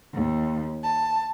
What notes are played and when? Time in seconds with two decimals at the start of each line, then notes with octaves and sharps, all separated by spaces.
0.14 D#2
0.83 A5